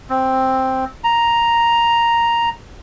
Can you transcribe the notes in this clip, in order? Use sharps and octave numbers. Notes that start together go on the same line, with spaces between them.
C4
A#5